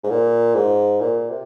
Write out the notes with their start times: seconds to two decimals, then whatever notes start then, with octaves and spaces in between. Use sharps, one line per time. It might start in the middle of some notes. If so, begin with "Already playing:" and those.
0.04 G#2
0.10 A#2
0.55 G#2
1.00 A#2
1.30 C3